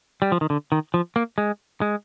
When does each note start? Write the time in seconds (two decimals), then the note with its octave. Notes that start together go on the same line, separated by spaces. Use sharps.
0.22 G3
0.32 F3
0.41 D#3
0.50 D3
0.72 D#3
0.94 F3
1.16 A#3
1.38 G#3
1.81 G#3